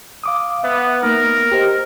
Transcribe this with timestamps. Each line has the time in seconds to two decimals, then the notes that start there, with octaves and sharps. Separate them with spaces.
0.24 F5 D6 D#6
0.63 B3 E5
1.02 A#3 B3 D#4 A#4
1.52 G4 C5 D#5